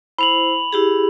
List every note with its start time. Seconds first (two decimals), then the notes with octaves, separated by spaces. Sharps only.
0.18 E4 C5 B5 F7 F#7
0.73 E4 G4 G#4